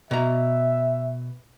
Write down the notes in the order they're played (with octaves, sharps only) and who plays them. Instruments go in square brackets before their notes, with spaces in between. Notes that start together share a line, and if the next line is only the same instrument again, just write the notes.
[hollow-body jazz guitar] B2 A#5 [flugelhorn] E5